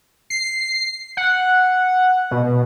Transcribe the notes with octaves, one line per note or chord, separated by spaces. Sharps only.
C7
F#5
B2